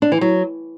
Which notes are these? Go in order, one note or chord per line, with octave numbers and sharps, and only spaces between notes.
D4
E3
F#3